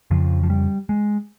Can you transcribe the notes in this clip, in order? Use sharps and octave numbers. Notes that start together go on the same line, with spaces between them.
F2 C#3 F3
F3
G3
G#3